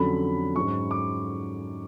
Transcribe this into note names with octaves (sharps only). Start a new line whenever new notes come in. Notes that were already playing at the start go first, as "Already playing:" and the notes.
Already playing: F2 D3 F#3 C#4 B5
G#2 F#3 C#4 C#6
D6